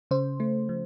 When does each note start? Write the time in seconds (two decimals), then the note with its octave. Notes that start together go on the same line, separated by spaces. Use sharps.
0.11 C#3 C5
0.40 A3
0.69 F3